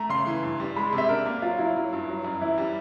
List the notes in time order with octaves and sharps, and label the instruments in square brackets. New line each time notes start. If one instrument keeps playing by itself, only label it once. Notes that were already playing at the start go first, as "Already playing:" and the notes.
Already playing: [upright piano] A3 [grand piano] A#5
[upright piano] C#3 [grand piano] C6
[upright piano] E3
G2
G3
[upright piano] G#3 [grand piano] B5
[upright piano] C3
[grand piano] E5
[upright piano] D4 [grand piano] A#4
[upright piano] A#3
[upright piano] F#3 [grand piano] F4
[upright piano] F#3 [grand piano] E4
[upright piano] F#3
G2
F#3
F#2
[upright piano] E3 [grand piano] E4
[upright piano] G3